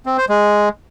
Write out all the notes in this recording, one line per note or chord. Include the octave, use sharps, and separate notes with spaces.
C4
C5
G#3